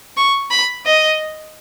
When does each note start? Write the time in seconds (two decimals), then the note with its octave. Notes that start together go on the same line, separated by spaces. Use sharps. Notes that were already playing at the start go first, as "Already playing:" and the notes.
0.17 C#6
0.51 B5
0.86 D#5